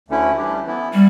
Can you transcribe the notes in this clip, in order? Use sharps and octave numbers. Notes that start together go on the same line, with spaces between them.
D2 D3 A3 C#4 E4
E3 G3 D4 G4
E3 B3 E4
G3